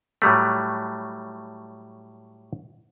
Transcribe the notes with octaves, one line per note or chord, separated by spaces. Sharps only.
A2 F#3 G3 A3